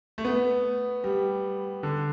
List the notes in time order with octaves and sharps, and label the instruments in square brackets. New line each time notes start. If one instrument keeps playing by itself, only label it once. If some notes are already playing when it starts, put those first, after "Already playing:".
[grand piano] A3
B3
G3
D3